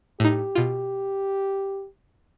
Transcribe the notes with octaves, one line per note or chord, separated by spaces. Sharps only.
A2 D#4 G4
B2 F4